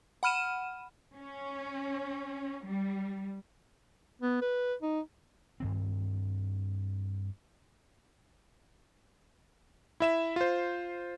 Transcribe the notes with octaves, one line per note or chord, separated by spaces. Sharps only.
F#5 B5 F6 D#7 E7
C#4
G3
B3
B4
D#4
G2 D#3 C4
E4 E5 E7
F4 C5